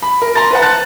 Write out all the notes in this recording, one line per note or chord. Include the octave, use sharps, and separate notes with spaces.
B5
A#4
A#5 C6 A6
B4 C5 F#5
A5 F#6 A6